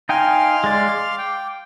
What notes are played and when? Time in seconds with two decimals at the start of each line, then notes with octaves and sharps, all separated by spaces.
0.09 D#4 F5 G5 G#5 C6 F6
0.64 G#3 D5
0.89 D6
1.18 G5